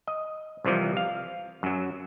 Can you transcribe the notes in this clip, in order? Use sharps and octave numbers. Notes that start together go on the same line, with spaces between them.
D#5
C2 C3 E3 F3 G3
F5
F#2 F#3